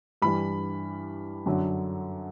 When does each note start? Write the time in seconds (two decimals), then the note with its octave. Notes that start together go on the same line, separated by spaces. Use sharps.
0.22 G2 E3 G3 B5
1.46 F#2 D3 F#3